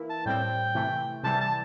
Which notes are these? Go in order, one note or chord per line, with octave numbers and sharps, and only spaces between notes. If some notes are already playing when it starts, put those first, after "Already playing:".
Already playing: E3 A#3 E4
A5
A2 G3 C4 G5
C3 E3 A3
C3 E3 G3 A5
A5